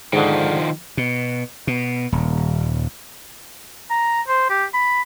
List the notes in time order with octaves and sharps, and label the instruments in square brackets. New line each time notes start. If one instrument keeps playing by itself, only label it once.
[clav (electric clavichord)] G#2 D3 [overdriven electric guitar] D#3 F3
[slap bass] B2
B2
D#1
[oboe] A#5
C5
G4
B5